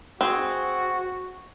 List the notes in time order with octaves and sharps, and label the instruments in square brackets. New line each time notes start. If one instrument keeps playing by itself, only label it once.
[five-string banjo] C4 G#4 [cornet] F#4